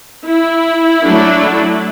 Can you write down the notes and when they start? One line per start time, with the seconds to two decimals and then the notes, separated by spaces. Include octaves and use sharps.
0.26 E4
1.03 F#3 A3 D4